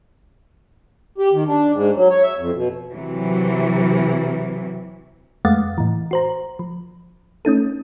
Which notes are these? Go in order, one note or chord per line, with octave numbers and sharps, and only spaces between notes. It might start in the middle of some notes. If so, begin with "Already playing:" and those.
G4
D#3
D4
G#2
F#3
C#5
E5
F2
B2
C3 E3 F#3
F2 G#3 A3 F5 F#5 A6
A2 E3
F#4 C5 A#5
F3
A3 C#4 D#4 A4